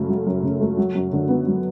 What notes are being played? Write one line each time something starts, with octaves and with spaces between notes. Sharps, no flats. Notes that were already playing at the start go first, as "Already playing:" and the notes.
Already playing: F#2 C#3 A3
F#3
F#2
C#3
A3
F#3
F#2
D3
B3
F#3